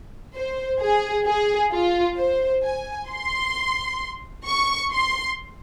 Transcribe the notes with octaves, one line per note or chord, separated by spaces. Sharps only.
C5
G#4
G#4
F4
C5
G#5
C6
C#6
C6